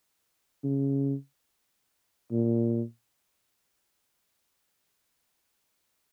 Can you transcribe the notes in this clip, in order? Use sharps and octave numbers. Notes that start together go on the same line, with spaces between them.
C#3
A#2